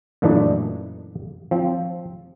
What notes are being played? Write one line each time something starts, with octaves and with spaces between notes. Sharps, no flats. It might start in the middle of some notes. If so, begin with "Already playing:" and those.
F#2 A#2 E3 A3 D4 D#4
F3 C4